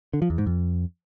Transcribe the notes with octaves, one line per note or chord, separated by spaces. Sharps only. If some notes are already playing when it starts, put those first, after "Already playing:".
D3
F3
E2
G#2
F2